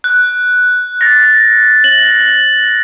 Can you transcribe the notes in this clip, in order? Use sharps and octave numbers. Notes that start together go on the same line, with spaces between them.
F#6
A6 A#6
F#7